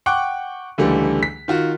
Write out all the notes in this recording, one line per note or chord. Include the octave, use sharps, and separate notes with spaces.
F#5 G5 C#6 D6 F#6
C#2 D3 E3 G3 A3
B6
D#3 F4 F#4